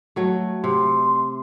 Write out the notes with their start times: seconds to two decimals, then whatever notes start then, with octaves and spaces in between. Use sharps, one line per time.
0.16 F#3 A3
0.64 C3 C6